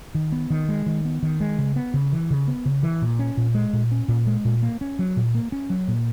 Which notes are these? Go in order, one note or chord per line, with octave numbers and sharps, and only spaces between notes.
D#3
B3
D#3
G#3
D#3
B3
D#3
G#3
C#3
B3
C#3
E3
C#3
B3
C#3
E3
A#2
C#4
A#2
G#3
A#2
C#4
A#2
G#3
A#2
A#3
C#4
F#3
A#2
A#3
C#4
F#3
A#2